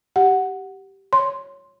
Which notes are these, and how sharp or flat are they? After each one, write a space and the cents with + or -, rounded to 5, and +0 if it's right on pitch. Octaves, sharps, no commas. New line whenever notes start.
G4 -10 F#5 +0
C#5 +0 C6 +0